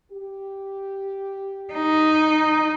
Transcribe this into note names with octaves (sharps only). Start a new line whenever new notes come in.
G4
D#4